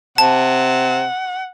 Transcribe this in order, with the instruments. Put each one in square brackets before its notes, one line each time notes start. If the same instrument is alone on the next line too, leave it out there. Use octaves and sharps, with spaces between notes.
[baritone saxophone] C3 [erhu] F#5 [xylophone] A5